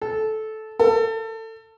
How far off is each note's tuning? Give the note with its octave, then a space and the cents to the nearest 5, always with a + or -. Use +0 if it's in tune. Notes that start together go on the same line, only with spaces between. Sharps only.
A4 -15
A4 +25